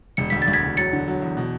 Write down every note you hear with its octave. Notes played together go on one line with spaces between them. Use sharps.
E1 C#7
D2 B6
A6
D2
G#6 B6
E1
F#3 A6 C#7
D3
F#3
E2
B2